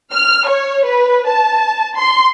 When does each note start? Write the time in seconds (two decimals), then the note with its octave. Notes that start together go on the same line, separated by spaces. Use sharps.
0.15 F6
0.47 C#5
0.87 B4
1.29 A5
1.97 C6